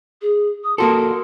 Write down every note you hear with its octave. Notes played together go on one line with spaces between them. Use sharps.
G#4
D#6
A#3 F#4 A4 C6